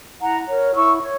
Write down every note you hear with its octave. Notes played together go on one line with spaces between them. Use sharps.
E4 F#5 A#5
A#4 C#5
E4 C#6 E6
C#5